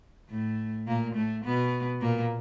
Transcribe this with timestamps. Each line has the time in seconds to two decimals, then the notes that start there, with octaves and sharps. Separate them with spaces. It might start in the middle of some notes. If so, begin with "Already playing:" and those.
0.30 A2 A3
0.87 A#2 A#3
1.15 A2 A3
1.44 B2 B3
2.01 A#2 A#3